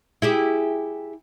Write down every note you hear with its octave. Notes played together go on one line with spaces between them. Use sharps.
E4 G4 G#4